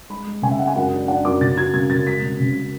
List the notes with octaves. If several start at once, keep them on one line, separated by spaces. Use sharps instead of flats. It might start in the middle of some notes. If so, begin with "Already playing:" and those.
G#3 B5
G#3
C#3 G#5
E5
G#3 F#5
G#5
F#2 F#5
D4
D4 F#5
F#2 D6
C#3 A6
F#3 G#6
C#3 G#6
C#3 A6
G#3 B6
C#3
C#3
C#3